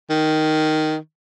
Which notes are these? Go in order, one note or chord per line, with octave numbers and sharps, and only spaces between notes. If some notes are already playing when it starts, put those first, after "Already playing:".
D#3